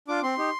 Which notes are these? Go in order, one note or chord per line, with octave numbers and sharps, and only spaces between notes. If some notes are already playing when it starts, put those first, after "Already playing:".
D4 F4 D6
C4 C6
D#4 G4